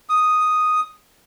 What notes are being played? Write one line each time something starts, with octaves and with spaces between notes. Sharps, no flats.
D#6